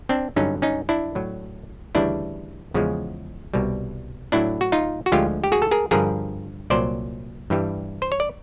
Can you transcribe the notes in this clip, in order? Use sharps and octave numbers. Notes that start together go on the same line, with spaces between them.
C4 D4
G2 D3 F#3 C#4 D#4
C#4 D#4
D4 E4
A2 F#3
D2 C#3 E3 G3 D4 E4
E2 C#3 F3 G#3
C2 B2 G3
A2 F#3 D4 E4
F#4
D#4 F4
F#4
D2 D3 F3 G#3 F4 G4
G4
F#4 G#4
A4
G#4 A#4
G2 D3 F3 G#4 A#4
C2 A#2 F#3 C5 D5
G2 E3 G3
C5
C#5
D5